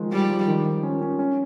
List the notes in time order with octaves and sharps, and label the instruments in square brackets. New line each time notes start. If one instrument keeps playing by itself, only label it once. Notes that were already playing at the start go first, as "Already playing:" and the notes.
Already playing: [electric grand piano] D#3 F3 G#3
[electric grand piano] F3 [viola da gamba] G3
[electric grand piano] F3
D#3
D#3
C#4
C#4
C#4